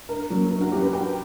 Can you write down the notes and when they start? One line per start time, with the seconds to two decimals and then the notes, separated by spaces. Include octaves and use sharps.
0.09 G2 A#4
0.30 F#3 A#3 C#4
0.51 G2 A#4
0.61 F#4
0.72 F#3 A#3 C#4 G4
0.82 B4
0.93 G2 G5